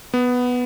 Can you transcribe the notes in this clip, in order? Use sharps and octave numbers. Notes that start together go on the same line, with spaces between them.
B3